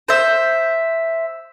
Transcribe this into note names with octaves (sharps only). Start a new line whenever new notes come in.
C5 E5